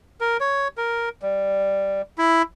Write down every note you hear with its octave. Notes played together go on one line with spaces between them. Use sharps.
A#4
C#5
A#4
G3
E4